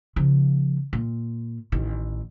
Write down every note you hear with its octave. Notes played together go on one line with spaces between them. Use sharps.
C#3 F3
A#2
A1 D#3